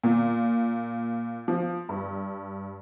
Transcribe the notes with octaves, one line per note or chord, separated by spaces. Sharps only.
A#2
F3
G2